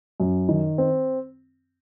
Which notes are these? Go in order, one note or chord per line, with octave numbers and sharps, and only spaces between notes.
F#2
D#3
C4